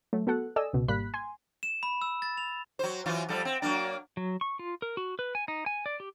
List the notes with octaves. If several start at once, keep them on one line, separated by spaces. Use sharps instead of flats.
F#3 A3
B3 F#4 A4 F#5
A4 D5 D#5 G#5 E6
C#2 B2
G#1 G3 A#3 B5 F#6 B6
G#5 C6
E7
B5
E6
A6
F7
F#3 C5
E3 F#3 F4
F3 G3 A4
C4
F#3 A#3 D4
F#3
C#6
F4
A#4
F#4
B4
G#5
D#4
G#5
D5
G4